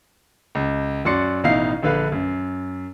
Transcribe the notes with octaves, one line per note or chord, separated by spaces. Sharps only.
C#2
F#2 F#4 D5 C6 C#7
A1 B2 D#4 E4 F5 C7
A#1 D3 B4 F5
F#2